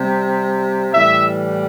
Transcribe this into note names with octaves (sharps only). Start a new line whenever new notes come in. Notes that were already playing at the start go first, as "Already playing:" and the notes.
Already playing: C3 G3 C4
A2 E3 G3 E5